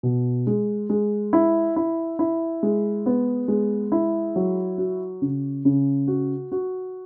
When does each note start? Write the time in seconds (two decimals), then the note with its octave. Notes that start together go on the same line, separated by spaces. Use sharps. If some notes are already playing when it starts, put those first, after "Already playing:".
0.03 B2
0.47 G#3
0.90 G#3
1.33 E4
1.76 E4
2.19 E4
2.63 G#3
3.06 B3
3.48 G#3
3.92 E4
4.36 F#3
4.78 F#4
5.22 C#3
5.65 C#3
6.08 F#4
6.52 F#4